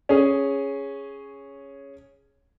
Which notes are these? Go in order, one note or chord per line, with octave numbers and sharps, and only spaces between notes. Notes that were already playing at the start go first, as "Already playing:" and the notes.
C#4 G#4